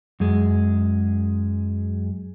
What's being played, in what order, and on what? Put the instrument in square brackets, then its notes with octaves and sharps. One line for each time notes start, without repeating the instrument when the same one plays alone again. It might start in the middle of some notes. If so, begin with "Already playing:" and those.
[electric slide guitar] F#2 G#3